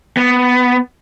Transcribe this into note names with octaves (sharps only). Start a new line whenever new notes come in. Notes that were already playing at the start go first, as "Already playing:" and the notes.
B3